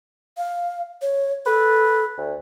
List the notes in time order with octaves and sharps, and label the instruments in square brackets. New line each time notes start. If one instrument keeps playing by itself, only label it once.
[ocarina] F5
C#5
[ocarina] A4 [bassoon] B4
[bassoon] D2